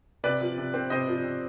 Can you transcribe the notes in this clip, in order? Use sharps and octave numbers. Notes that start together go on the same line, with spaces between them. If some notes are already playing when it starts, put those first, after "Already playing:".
C3 B4 D5
F3
C3
C4
C3 C5 D#5
F3
C3